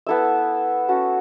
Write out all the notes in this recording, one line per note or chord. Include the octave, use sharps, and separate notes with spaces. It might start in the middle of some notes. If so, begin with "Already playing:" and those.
B3 E4 A4 E5
C#4 F#4 A4